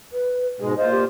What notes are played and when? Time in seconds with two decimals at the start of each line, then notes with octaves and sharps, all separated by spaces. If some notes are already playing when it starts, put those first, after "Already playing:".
0.12 B4
0.60 G#2 B2 G#3 G#4
0.77 A#2 F4 C5 D#5
0.91 G4